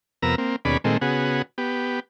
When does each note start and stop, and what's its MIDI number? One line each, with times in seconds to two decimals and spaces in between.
0.22 0.35 41
0.22 0.35 48
0.22 0.35 59
0.22 0.35 70
0.22 0.35 82
0.22 0.35 88
0.38 0.56 58
0.38 0.56 60
0.65 0.77 39
0.65 0.77 47
0.65 0.77 61
0.65 0.77 68
0.65 0.77 74
0.65 0.77 83
0.84 0.97 46
0.84 0.97 51
0.84 0.97 56
0.84 0.97 57
0.84 0.97 60
1.01 1.42 49
1.01 1.42 59
1.01 1.42 66
1.01 1.42 68
1.58 2.00 59
1.58 2.00 67